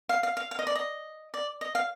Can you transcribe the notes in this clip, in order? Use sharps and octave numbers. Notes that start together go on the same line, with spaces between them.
F5
F5
F5
F5
D#5
D5
D#5
D5
D#5
F5